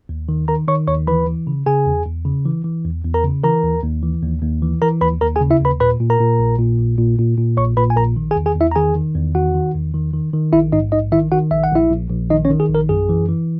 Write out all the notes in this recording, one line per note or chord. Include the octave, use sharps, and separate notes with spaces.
D#2
D#3
D#3 A#4 A#5
D#3 C#5 C#6
D#2 C#5 C#6
E3 B4 B5
E3
C#3
C#3 G#4 G#5
E2
E2
C#3
E3
E3
E2
E2
A#4 A#5
C#3
E3 A#4 A#5
D#2
D#2
E3
D#2
D#2
E3
E3 A#4 A#5
D#2 B4 B5
D#2 A#4 A#5
G#4 G#5
C#3
E4 E5
D#2 B4 B5
A#2 B4 B5
A#2
A#4 A#5
A#2
A#1
A#2
A#1
A#2
A#2
A#2
A#1 C#5 C#6
A#2 B4 B5
G#5
A#1 A#4 A#5
D#3
G#4 G#5
E2
G#4 G#5
E2 E4 E5
A#5
D#3 G#4 G#5
D#3
E2
D#3 F#4 F#5
D#3
E2
D#3
D#3
D#3
A#1 E4 E5
G#2 D#4 D#5
A#1 D#4 D#5
D#3 E4 E5
D#3 F#4 F#5
A#1 E5
F#5
A#1 E4 E5
A#1
A#1
D#3 D#4 D#5
C#4 C#5
D#3
G#4
A#1
A#4
F#2 G#4
E3
E3